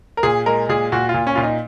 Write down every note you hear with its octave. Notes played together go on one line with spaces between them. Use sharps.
A#4
A#2 G#4
G#3 A#4
A#2 G#4
A#2 F#4
F4
A#2
C#4
A#2 F4
D#4